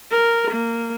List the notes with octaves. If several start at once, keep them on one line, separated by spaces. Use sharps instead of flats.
A#4
A#3